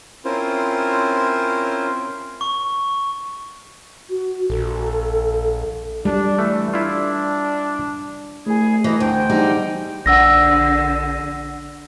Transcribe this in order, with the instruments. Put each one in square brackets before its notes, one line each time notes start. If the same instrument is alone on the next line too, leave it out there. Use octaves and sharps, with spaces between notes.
[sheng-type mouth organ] C4 C#4 E4 F4 A#4 C5
[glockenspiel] C#6
[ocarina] F#4
[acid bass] A#1 [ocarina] A4
[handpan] G3 [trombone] D4
[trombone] E3 [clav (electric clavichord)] A3
[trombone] D4 [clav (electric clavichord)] E4 F4
[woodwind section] C2 E4 G#4 [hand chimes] A3 G#5
[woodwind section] D#3 C5 D#5 [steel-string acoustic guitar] E3
[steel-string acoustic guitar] D2 [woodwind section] C5 G5
[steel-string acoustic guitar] E2 G3 D#4
[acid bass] A#1 [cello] D3 [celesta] F#5 E6 A#6